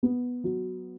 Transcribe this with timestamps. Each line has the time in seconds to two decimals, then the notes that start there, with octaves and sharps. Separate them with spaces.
0.03 B3
0.44 F#3